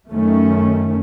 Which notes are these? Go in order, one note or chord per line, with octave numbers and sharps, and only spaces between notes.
F#2 D#3 A3 C#4